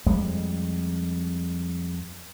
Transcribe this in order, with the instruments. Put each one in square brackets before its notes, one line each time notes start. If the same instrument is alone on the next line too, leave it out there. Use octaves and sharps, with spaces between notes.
[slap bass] F2 G3 G#3